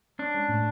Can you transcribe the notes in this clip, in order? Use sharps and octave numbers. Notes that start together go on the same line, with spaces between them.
C#4 D4
G#3
A2